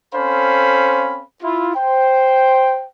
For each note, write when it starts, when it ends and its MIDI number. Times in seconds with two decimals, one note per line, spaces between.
0.15 1.23 60
0.15 1.23 61
0.15 1.23 69
0.15 1.23 72
0.15 1.23 77
0.15 1.23 83
1.43 1.72 64
1.43 1.72 65
1.75 2.85 72
1.75 2.85 79